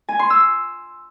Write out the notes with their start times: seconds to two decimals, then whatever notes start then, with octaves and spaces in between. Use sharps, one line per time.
0.09 G#5
0.19 C6
0.30 E6